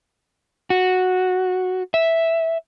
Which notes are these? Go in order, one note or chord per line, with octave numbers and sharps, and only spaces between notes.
F#4
E5